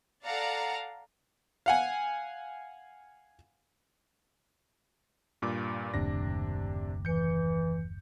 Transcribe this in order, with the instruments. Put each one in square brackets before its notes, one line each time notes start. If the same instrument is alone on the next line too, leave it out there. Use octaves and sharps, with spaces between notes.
[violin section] A4 D5 F5 F#5 A#5
[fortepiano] F5 F#5 G#5
[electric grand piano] G2 A#2 D6
[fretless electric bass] F#1 D#2 A2 [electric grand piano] C3 D4 A#6
[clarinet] E3 [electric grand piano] G6 C#7